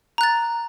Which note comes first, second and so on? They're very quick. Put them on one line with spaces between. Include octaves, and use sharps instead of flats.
A#5 F#6 A6